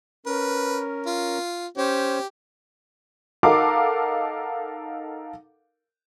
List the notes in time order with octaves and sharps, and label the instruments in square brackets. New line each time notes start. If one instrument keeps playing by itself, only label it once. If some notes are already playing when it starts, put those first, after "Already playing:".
[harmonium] C#4 A#4 [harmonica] B4
[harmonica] F4
[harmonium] C#4 C5 C#5 [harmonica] G4
[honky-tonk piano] D#4 A4 A#4 F5 F#5 D6